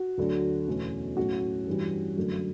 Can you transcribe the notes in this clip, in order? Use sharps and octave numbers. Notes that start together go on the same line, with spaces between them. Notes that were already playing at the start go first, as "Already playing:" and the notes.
Already playing: F#4
D2 D3 F#3
E2 B2 A3 C#4
A2 F#3 C#4 F#4
G2 E3 G3 C#4
F#2 D3 F#3 A3